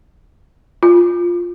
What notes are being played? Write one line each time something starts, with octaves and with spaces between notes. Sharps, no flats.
F4